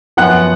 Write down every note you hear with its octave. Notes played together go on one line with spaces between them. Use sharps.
F#2 F3 B3 F#5 F#6